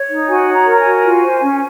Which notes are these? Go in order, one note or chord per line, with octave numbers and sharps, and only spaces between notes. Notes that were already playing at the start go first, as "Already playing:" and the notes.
Already playing: C#5
D#4
F#4 G#5
C#5
A#5
A#4
A#5
G#5
F#4
F4
C5
C#4